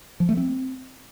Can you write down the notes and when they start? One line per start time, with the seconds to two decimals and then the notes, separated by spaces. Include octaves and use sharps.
0.20 F3
0.29 A3
0.37 C4